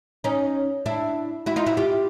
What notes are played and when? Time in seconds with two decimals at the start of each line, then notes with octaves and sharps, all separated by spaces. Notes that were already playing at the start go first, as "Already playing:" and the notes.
0.24 C#4 D#4
0.86 D4 E4
1.46 E4 F#4
1.56 D#4 F4
1.66 E4 F#4
1.77 F4 G4